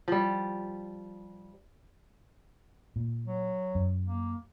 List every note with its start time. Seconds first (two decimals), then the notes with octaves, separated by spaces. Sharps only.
0.08 F3 G3
2.96 A#2
3.26 F#3
3.75 F#2
4.05 A#3